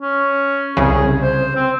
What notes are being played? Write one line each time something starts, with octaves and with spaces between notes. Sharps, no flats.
C#4
C2 C#3 G#4
C5
C4